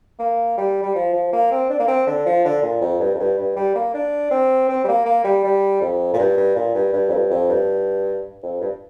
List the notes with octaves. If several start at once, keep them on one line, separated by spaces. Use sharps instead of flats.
A#3
G3
G3
F3
F3
A#3
C4
D4
A#3
C4
D3
F3
D3
A#2
F2
G2
F2
G2
G2
G3
A#3
D4
C4
C4
G3
A#3
A#3
G3
G3
F2
A#2
G2
G2
A#2
G2
G2
F2
G2
F2
G2
F2
G2